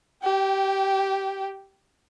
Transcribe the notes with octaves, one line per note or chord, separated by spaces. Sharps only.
G4 G5